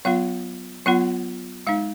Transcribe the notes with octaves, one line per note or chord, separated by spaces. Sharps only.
F#3 B3 F4 F5
F#3 B3 F4 F#5
G#3 D#4 F5